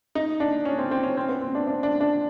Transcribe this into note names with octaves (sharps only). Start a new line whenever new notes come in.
D#4
D4
C#4
C4
C4
C#4
C4
B3
C4
D4
D4
D4
D4